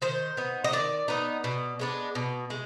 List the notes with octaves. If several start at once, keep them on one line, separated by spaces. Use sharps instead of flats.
D#3 C5
B3 D#4
D#5
D#3 D5
B3 D#4
B2
G#3 B3 D4
B2
G#3